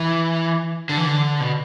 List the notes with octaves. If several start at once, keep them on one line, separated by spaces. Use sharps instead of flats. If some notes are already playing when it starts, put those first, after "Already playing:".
Already playing: E3
D3
E3
D3
B2